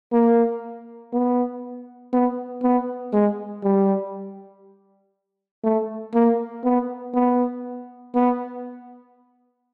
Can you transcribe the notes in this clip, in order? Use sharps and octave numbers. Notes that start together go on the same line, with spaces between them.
A#3
B3
B3
B3
G#3
G3
A3
A#3
B3
B3
B3